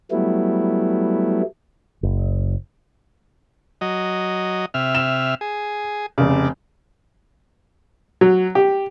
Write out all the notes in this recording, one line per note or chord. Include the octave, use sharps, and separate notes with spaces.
F#3 G3 A3 B3 E4
F#1
F#3 D#5
C3 E5 F6
E7
G#4
F1 C#3 D5
F#3
G4